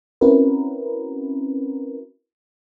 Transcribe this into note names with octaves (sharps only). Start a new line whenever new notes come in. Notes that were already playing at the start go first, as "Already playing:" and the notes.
C4 C#4 E4 F#4 A#4 B4